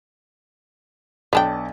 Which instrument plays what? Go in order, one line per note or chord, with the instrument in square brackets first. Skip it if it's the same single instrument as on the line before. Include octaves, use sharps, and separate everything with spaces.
[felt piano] B1 A5 [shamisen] B3 D4 G5